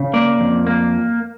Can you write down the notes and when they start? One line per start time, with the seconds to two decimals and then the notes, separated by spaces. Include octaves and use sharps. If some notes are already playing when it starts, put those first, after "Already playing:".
Already playing: C#3
0.14 A#3 D5
0.40 F2
0.67 A#3